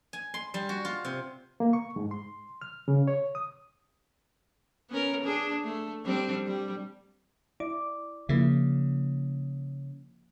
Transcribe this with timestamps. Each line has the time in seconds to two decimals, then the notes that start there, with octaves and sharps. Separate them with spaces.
0.13 G#5
0.34 C6
0.54 G3
0.69 F#4
0.85 F4
1.05 C3
1.60 A#3
1.73 C#6
1.96 G#2
2.11 C6
2.62 F6
2.88 C#3
3.08 C#5
3.35 D#6
4.90 B3 C#4 A#4
5.24 D4 G#4
5.64 A3
6.05 G3 C4 D4
6.47 G3
7.60 E4 D5 D6
8.29 C#3 F3 A#3 E4